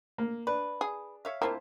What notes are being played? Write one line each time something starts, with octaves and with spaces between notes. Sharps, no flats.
A#3
D4 B4
G#4
C#5 E5 F5
A#3 C4 E4 F4 C5 A5